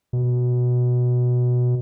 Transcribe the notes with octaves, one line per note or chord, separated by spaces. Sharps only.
B2